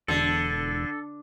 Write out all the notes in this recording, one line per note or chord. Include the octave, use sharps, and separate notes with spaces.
E1 D3 A4